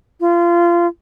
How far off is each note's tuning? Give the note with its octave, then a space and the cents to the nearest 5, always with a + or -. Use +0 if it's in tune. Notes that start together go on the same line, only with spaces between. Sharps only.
F4 -25